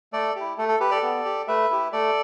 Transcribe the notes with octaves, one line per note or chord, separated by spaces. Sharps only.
A3 A4 D5
E4 G4
A3 A4
A4
G4 B4
A4 D5
B3
G4
A3 B4 E5
E4 G4
A3 A4 D5